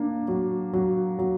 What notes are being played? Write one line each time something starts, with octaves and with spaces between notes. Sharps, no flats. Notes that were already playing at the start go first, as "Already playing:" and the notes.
Already playing: A#3 D4
F#3
F#3
F#3